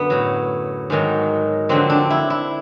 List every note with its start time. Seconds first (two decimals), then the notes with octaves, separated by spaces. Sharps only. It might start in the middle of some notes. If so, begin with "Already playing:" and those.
Already playing: F#2 D3 B3
0.10 A2 F#3
0.90 G#2 D#3 F#3
1.69 F2 D3 F#3 C4
1.90 D4
2.10 E4
2.30 E4